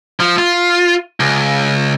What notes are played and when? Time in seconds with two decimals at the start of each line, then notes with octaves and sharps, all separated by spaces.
0.20 F3
0.38 F4
1.20 C#2